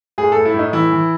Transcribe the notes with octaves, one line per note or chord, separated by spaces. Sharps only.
A2 G#4
A2 A4
E4
A2
D#4
E3 E4
E3